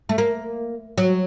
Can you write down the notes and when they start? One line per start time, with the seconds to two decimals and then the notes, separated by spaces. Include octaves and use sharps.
0.09 A3
0.18 A#3
0.98 F#3